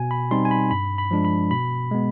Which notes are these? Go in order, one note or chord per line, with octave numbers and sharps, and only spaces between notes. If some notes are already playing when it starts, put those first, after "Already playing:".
Already playing: B2 G#5
B5
G3 C4 D#4 C6
G#5
B5
G2 B5
B5
F3 G#3 D4
B5
B2 B5
G#3 B3